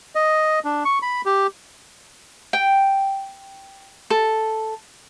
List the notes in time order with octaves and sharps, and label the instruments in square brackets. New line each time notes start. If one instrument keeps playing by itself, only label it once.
[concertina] D#5
D4
C#6
B5
G4
[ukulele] G5
A4